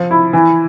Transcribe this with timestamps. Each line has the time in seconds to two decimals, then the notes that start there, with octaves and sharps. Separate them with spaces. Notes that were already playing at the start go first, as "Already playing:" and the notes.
Already playing: F3
0.11 E4
0.33 E3